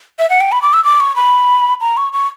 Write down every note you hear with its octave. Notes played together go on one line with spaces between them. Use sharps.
E5
F#5
G5
B5
D6
E6
D6
C#6
B5
A#5
C#6
C#6